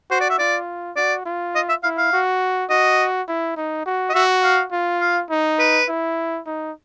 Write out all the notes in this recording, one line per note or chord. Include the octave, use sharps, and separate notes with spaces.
F#4 C5
D5
E5
F4 D5
F#4 D5
F4
D#5
E5
E4 F5
F5
F#4
F#4 D#5
E4
D#4
F#4
D#5
F#4 E5
F5
F4
F5
D#4
B4
E4
D#4